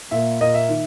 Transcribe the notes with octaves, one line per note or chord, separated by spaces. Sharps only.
A#2 A#3 E5
A#2 A#3 D#5
E5
D#3